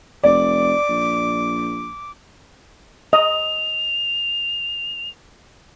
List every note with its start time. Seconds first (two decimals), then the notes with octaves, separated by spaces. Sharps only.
0.24 F1 D5 D6
0.89 A#1
3.13 D#5 F7